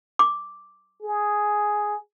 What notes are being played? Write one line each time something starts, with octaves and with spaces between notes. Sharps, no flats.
D6
G#4